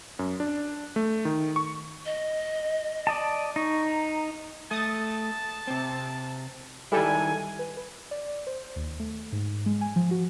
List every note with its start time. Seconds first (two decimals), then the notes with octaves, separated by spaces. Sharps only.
0.19 F#2
0.40 D4
0.96 A3
1.25 D#3
1.56 C#6
2.05 D#5
3.07 D5 D#5 A5
3.56 D#4 C#6
3.88 A#5
4.71 A3 A5 D#6 A6
5.67 C3 C4
6.92 D#3 G3 G#3 E4 A4 G#5
7.59 B4
7.77 B4
8.11 D5
8.47 C5
8.76 D#2
9.00 A3
9.32 G#2
9.66 G#3
9.81 G#5
9.96 F3
10.11 F#4